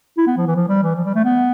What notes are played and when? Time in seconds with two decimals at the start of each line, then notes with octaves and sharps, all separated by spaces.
0.17 E4
0.27 B3
0.37 F3
0.47 E3
0.56 F3
0.68 G3
0.83 E3
0.95 F3
1.05 G3
1.15 A3
1.24 B3